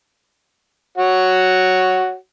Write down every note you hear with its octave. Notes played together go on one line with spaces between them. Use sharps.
F#4 C#5